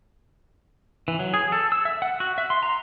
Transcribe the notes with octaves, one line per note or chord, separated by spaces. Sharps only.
E3
F#3
G#4
A4
E6
E5
F#5
F#4
E5
C6
A#5